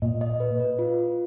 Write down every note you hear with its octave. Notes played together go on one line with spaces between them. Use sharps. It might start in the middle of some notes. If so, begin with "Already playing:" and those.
A#2 D#5
D#5
B4
B4
F4
F4